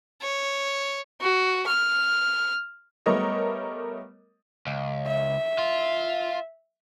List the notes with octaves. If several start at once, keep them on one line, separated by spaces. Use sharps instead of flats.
C#5
F#4
F6
G3 A3 B3 A#4 C#5 D#5
C#2
E5
F4